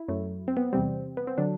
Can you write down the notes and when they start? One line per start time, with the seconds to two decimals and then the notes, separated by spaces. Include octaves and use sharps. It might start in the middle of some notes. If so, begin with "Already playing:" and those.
Already playing: E4
0.08 F#2 F#3 A3
0.48 C4
0.57 B3
0.73 E2 C3 G3 C4
1.17 B3
1.27 C4
1.38 D3 F#3 D4